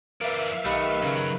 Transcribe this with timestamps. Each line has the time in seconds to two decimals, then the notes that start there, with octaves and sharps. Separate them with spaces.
0.21 E3 A#4 B4 D5 E5 F5
0.65 B1 D#3 A3 G4 B4 D#5
1.02 F#2 C#3 F#3 A#4